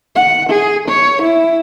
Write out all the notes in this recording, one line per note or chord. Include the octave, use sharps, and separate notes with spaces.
F#5
G#4
C#5
E4